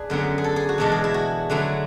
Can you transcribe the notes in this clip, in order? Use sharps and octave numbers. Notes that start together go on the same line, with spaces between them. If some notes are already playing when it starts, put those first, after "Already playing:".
Already playing: D4 G#4 B4
F#2 D3 F#3 B3
G#4
A4
G#4
F#4
E2 B2 G#3 D4 A4
G#4
E4
F#4
D3 F#3 A3 E4